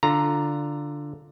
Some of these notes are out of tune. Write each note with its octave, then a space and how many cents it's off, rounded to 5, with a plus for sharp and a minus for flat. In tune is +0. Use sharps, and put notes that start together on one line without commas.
D3 +0 F4 +0 A#5 +0